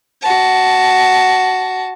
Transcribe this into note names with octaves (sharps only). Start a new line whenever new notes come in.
F#4 A5